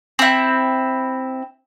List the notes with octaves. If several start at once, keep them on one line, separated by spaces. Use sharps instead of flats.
C4 E4